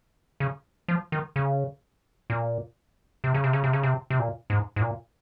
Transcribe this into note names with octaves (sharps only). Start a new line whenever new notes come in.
C#3
F3
D#3
C#3
A#2
C3
C#3
C3
C#3
C3
C#3
C3
C3
A#2
G#2
G#2
A#2